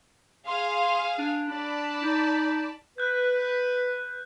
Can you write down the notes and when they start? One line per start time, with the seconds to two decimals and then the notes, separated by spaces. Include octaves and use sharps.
0.48 G#4 F5 C6
1.19 D4
1.49 D4 D5 A5 B5
2.03 D#4
2.98 B4 F#6 G6